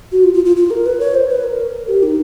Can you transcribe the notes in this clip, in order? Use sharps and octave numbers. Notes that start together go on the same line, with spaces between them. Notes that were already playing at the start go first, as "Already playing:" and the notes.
F#4
F4
F4
F4
F4
A#4
B4
C#5
C5
B4
A#4
G4
D#4